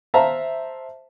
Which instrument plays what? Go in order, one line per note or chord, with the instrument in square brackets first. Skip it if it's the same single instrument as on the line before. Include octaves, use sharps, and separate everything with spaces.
[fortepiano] C5 E5 F5 A5 A#5